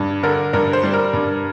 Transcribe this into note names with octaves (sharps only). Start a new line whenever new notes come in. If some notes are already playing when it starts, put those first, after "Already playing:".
Already playing: G2
D3 A#4
G2 A#4
C5
G3
A#4
G2